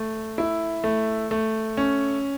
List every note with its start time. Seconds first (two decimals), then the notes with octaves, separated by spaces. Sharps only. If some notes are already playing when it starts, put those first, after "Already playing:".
Already playing: A3
0.38 E4
0.84 A3
1.31 A3
1.77 C#4